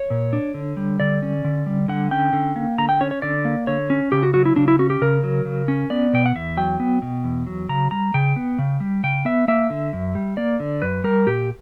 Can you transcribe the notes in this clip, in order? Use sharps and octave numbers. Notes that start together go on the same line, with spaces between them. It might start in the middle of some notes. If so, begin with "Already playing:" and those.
Already playing: C#5
A#2
D4
D3
G3
D3 D5
C#4
D3
G3
D3 F#5
C#4 G5
D3
A#3
D3 A#5
G5
C#4 C#5
C#5
D3 D5
A#3
D3 C#5
C#4
C#3 G4
F#4
F#3 F#4
E4
C#3 D4
E4
C#4 F#4
G4
C#3 A#4
F#3
C#3
C#4
B3 D5
B2 G5
F#5
E2 E5
F#3 G5
B3
B2
E2
F#3
C#3 A#5
G3 A#5
C#3 G5
B3
C#3
G3
C#3 G5
B3 E5
A#3 E5
D3
F#2
G3
A#3 D5
D3
F#2 B4
G3 A#4
A#2 G4